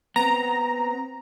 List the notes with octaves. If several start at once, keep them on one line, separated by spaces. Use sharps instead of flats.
B3 C4 A#5